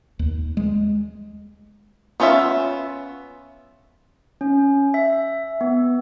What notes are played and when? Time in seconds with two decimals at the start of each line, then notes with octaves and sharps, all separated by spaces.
0.19 D#2
0.57 G#3
2.20 B3 C#4 F4 C#5 E5
4.41 C#4
4.94 E5
5.61 B3